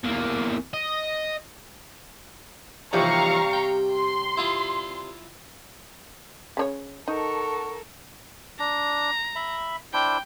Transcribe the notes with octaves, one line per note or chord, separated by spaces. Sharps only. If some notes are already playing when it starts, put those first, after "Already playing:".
E2 A#3
D#5
D#2 C3 E3 F3 G3 F5 A#5 C#6
G5
C6
E4 F4 D#6
C#3 D4 C#5
D#4 A4 A#4 F#5 A5 C#6
D4 A#5
E5 B5
D4 E4 C5 G5